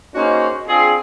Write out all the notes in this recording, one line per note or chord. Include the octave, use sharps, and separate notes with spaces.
A#3 C#4 D#4 F#4 G#4 C5
C4 D4 F4 G#4